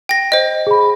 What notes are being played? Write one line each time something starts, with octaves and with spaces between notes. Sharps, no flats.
G5 A#6
C5 D#5
G#4 B5